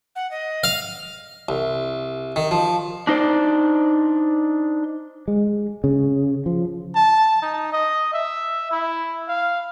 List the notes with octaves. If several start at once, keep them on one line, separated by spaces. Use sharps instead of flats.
F#5
D#5
F5
C2
D#3
F3
D4 D#4 C5 D5
G#3
C#3
F3
A5
D#4
D#5
E5
E4
F5